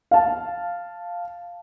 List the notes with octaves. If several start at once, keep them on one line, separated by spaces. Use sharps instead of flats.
F5 A5